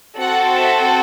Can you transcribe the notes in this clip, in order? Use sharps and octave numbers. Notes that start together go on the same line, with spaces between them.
C4 F#4 A4 F#5
E5